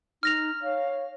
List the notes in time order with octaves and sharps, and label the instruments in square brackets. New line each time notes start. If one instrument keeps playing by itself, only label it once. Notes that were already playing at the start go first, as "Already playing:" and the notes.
[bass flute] D#4 [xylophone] F6 A#6 F7
[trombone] C#5 [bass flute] F5